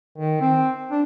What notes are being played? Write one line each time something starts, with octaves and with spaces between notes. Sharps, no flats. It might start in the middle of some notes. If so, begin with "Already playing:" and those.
D#3
C4
D4